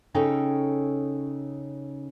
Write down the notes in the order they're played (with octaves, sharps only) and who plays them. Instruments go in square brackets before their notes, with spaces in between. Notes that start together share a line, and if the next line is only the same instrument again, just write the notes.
[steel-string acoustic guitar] C#3 C#4 D#4 A4 C#5 G5